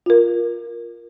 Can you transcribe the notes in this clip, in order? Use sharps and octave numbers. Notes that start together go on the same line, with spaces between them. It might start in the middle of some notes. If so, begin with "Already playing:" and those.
F4 A#4